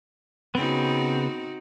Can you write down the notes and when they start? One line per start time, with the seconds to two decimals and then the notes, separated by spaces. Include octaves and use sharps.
0.55 C#3 B3 C4 D#4 F#4